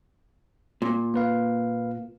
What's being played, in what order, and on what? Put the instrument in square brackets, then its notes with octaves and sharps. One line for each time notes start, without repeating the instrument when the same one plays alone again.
[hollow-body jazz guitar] A#2
[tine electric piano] A#3 B4 F5